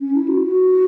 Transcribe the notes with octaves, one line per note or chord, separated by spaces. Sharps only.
C#4
E4
F#4
F#4